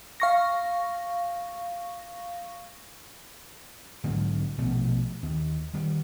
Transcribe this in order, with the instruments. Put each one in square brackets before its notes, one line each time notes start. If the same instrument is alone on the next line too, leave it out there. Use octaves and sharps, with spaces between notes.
[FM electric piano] F5 C#6 A#6
[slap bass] G#2 D3 F#3 A#3
A#1 B2 F3 A3
D#2
D#3 G3